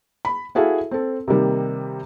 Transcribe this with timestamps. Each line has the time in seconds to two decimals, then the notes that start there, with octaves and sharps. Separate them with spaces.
0.25 B5
0.55 E4 F#4 G#4 A4 E5 F5
0.91 C4 A4
1.28 C3 D#3 G3 A#3